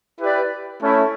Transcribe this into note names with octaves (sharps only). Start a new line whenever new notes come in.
E4 G4 B4 D5
A3 C#4 E4